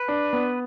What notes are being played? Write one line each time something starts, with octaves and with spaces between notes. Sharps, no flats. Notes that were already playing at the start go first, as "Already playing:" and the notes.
Already playing: B4
D4
B3